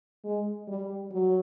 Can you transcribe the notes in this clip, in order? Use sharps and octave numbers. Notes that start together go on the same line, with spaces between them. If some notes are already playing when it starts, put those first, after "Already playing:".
G#3
G3
F#3